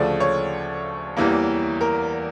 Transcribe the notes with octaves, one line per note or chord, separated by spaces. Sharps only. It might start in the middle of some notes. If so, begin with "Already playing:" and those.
Already playing: D2 C#3 F3 A3 D5
C#5
E2 E3 G3 A#3
A#4